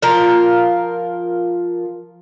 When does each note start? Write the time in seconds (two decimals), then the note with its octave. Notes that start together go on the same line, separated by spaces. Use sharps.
0.02 F3 F4 A#4